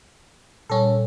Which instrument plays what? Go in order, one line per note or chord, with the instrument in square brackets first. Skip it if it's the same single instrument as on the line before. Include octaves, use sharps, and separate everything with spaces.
[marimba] A#2 G3 [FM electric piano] C#4 A4